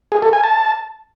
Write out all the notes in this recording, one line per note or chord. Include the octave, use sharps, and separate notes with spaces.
G#4
A4
G#5
A5